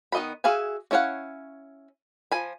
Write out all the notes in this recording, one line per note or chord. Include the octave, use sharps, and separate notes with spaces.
D#3 B3 D#5 F#5 B5
F#4 G#4 E5 F5 G#5
C#4 E4 C#5 F5 F#5
F3 G#5 B5